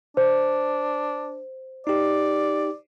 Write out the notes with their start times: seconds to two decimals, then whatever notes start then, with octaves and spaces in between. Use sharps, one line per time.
0.17 D4 C5
1.87 D#4 G4 D5